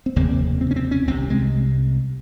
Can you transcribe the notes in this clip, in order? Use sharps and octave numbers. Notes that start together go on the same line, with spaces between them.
C4
F1 D#2 C#3 A#3
C4
C#4
C4
C#4
C2 C3 C4
G#3